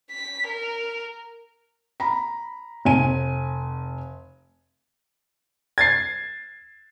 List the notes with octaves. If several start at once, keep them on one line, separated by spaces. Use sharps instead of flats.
B6
A#4
A#5 B5
F1 G#5 D#7
G#6 A6 C7